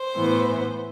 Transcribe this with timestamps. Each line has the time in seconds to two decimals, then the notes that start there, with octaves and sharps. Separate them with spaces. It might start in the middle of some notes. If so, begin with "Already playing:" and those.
Already playing: C5
0.15 A2 E3 B3